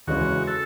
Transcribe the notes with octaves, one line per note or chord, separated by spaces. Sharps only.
E2 C#3 G#3 C#4 F#4
A4